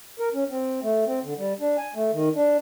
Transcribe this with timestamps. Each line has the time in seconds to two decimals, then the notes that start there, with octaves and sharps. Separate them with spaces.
0.20 A#4
0.34 C#4
0.51 C4
0.83 A3
1.07 C4
1.24 D3
1.38 G3
1.60 D4
1.77 G#5
1.95 A3
2.13 D#3
2.35 D4